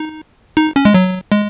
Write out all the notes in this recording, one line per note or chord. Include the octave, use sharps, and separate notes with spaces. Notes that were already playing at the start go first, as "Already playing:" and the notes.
Already playing: D#4
D#4
C#4
G#3
F#3
G#3